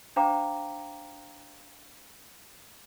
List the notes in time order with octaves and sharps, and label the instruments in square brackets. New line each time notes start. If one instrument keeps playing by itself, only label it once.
[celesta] D4 C5 F5 G5 A#5 D6